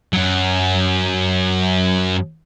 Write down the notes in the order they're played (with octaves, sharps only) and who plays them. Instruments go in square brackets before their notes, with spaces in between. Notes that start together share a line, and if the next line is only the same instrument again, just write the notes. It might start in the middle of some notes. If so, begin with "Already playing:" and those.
[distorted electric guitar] F#2 F#3